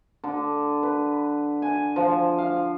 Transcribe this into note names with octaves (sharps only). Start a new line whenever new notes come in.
D3
B4
G#5
F3
F5